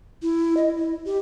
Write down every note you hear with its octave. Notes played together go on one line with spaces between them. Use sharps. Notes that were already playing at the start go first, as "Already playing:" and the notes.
E4
D#5
E4
G4